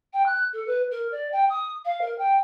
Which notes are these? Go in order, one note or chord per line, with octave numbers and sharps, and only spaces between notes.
G5
F#6
A4
B4
A#4
D5
G5
D#6
F5
A#4
G5